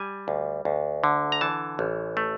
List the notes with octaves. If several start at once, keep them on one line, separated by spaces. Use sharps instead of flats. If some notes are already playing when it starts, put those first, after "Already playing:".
Already playing: G3 G#5
D2
D2
D3
A#5
E3 A5
A1
A3